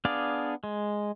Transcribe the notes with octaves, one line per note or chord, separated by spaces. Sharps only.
B3 D4 G#4 D5 F5
G#3